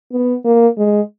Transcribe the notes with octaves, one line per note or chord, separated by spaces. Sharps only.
B3
A#3
G#3